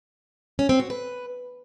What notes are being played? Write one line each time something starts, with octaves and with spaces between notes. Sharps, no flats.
C#4
C4
F#4
B4